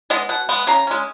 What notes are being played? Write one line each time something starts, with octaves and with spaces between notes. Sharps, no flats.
G#3 B3 D#5
B2 F#5
G#3 B3
C#3 A#5
G#3 C#4